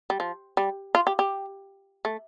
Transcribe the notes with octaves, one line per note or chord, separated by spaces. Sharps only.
G3
F3
G3
F4
G4
G4
A3